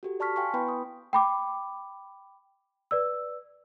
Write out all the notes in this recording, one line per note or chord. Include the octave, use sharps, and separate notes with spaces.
F#4 G4 A4
D5 A5 C#6 F6 B6
F5 G5 G#5 C6 C#6
B3 E4 B4 G5 B5 C6
D#6
G5 B5 D6
B4 D5 E6